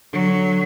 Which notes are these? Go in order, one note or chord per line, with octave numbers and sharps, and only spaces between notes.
D3 F#3